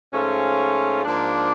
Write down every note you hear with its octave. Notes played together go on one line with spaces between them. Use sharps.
G#2 F3 A3 C#4 F4
G#2 F3 A#3 D4